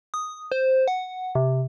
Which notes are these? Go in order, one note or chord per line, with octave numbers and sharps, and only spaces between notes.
D#6
C5
F#5
C3